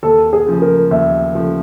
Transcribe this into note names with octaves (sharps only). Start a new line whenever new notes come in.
D#2 A4
G#4
C#3 F3 A3
A#4
D#2 E5
C#3 F3 A3